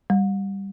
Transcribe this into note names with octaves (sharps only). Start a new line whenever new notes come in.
G3